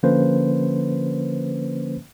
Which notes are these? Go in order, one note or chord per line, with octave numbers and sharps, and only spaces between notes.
D3 F3 A#3 C#4 B4 C5